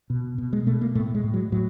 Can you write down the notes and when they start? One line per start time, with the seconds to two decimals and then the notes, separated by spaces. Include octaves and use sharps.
0.10 B2
0.38 B2
0.53 G#3
0.66 B2 A3
0.81 A#3
0.95 A2 A3
1.14 G#3
1.24 A2
1.34 F#3
1.52 A2 F#3